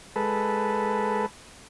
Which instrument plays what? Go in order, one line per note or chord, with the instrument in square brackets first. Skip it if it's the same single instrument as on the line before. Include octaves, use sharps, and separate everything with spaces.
[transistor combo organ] G#3 A4 B4